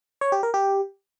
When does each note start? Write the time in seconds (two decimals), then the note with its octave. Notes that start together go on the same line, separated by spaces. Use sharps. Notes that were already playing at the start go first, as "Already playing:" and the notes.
0.21 C#5
0.32 G4
0.43 A#4
0.54 G4